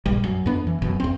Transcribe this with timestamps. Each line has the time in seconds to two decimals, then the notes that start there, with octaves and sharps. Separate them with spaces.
0.06 A#1 G2 G3
0.24 F#2
0.46 F2 B3 D4
0.67 E3
0.82 F#1 F#2 B2
1.00 E2 C4